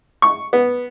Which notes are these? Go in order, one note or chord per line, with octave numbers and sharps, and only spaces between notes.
C#6
B3